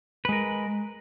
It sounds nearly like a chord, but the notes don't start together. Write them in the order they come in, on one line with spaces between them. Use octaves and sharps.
B4 G#3 A#4